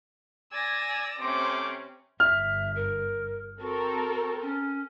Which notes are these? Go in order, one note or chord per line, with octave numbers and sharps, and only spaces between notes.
D5 G#5 E6 A#6
C3 A3 C#4 C5 D6
G1 E5 F6
A#4
C4 F#4 A4 A#4
C#4